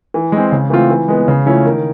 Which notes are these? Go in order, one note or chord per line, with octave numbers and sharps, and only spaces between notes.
E3
G#3 C4
C#3
E3 A3 C4 F4
E3
G#3 B3
C#3
F3 A3 C#4 E4
D#3